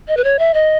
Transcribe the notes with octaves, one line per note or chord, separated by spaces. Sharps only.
D#5
B4
C#5
E5
D#5